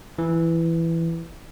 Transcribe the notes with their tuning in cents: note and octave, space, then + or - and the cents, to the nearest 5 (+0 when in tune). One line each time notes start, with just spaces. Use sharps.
E3 +10